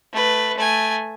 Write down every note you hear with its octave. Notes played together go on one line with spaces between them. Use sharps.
A3 B4
A3 G#5